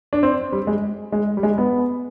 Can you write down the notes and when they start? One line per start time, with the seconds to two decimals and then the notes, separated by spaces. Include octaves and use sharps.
0.13 D4
0.23 C4
0.52 G3
0.67 G#3
1.12 G#3
1.37 G3
1.43 G#3
1.58 B3